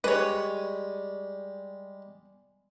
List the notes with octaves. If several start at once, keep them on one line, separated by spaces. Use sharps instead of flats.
G3 G#3 B4 C#5